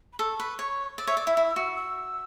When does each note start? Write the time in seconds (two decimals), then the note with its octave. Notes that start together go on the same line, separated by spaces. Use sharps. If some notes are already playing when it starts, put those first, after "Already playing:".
0.13 B5
0.19 A4 C#6
0.40 B4
0.59 C#5
0.98 D5 E6
1.07 C#5 E5
1.17 D5
1.27 E4
1.37 E4
1.56 F#4
1.77 E6